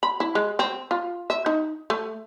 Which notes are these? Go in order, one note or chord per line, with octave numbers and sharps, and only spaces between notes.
B5
E4
G#3
C4
F4
E5
D#4
A3